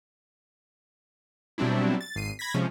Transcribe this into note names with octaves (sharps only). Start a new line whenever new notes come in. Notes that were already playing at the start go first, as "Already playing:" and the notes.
B2 F#3 G3 C4 D4 E4
A6
G#1 C7 D#7
B5 G#6 A#6 B6
C3 F3 G#3 C#4